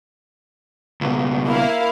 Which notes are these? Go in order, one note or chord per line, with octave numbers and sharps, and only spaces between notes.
C#2 B2
A#3 E4 F5